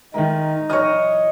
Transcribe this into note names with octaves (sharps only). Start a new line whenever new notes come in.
A#2 D#3 G#3 D#4 A#4 E5
A#2 E3 F#3 C#5 D#5 D#6 F6